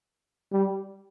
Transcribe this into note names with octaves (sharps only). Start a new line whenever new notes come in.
G3